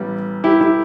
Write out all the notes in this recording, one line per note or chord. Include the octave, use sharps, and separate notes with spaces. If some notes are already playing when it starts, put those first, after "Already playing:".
Already playing: A1 G3 B3
E4 G4
E4 G4